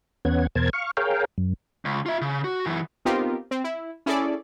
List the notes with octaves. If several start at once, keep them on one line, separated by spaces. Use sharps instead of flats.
E2 B3 C#4 F#5 G#6
E2 B2 A#4 C5 A5 G#6
F5 C#6
G#4 A#4 C#5 F5 G5
F#2
C#2
F4 E5
C#3
F#4
F#2 E3
B3 C4 D#4 F4 G4 A#4
C4
E4
C#4 E4 G#4 A4 D5